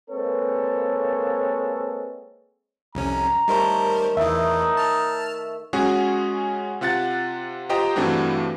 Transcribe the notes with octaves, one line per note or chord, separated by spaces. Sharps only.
G#3 A#3 C4 A4 B4 C#5
C2 F2 C#4 A#5
D#3 G3 A3 A#4 C5 C#5
E2 E3 D#4 E5
A5 F6
G#3 C#4 F#4 G#4
C3 F4 F#5 F#6 A6
F4 G4 C5 D#5 G5 A#5
G2 E3 A3 C4 D4 F#4